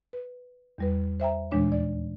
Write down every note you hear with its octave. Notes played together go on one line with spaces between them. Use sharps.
B4
E2 G3 B4
C5 E5 G5 A#5
D#2 A#2 E3 G#3 D4 C#5
D5